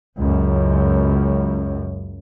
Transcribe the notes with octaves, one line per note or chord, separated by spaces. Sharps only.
C#2 F#2